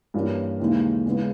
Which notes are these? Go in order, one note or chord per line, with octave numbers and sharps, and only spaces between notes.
G2 E3 A#3 C#4
D#2 C#3 E3 G#3 D#4
E2 C#3 G#3 B3